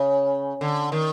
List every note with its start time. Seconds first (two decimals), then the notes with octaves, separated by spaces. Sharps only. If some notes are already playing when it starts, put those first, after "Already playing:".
Already playing: C#3
0.61 D3
0.92 D#3